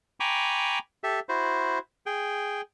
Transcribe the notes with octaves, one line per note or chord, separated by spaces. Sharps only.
G5 G#5 A#5 B5 C#6 D6
G4 A4 E5
E4 F#4 C5
G#4 G5